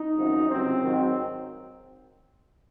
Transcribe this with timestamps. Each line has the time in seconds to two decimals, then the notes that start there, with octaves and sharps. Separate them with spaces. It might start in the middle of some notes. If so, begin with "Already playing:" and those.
Already playing: D#4
0.16 G#1 F#2 F3
0.48 C#2 C3 F#3 C4
0.82 G#1 G#2 D#3 F#3